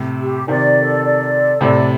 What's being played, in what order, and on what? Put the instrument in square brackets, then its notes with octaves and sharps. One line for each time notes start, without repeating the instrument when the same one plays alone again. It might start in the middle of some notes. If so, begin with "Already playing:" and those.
Already playing: [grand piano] A2 C3
[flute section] G4
[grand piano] C3 D#3 [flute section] D5
[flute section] A4
D5
A4
[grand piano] A2 C3 [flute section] D5